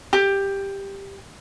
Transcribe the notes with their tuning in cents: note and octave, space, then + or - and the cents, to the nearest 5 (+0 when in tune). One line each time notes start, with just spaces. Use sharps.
G4 +10